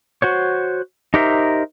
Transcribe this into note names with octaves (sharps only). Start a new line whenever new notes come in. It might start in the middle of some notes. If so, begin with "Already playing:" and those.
F#4 C5 C#5
D#4 G4 A#4 C5 E5